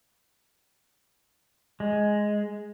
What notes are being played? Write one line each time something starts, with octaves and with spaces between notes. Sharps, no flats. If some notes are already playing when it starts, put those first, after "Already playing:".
G#3